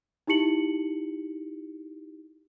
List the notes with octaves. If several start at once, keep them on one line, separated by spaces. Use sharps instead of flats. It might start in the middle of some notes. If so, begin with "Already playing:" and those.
D#4 E4 G4 C#7 F#7